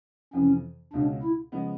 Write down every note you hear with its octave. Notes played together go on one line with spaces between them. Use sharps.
F2 C3 E3 C#4
C#2 B2 G#3 C#4 D4
E4
C#3 F3 G#3 B3